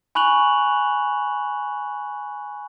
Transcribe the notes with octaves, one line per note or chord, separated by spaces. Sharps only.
G#5 B5 C#6 F#6 F7 F#7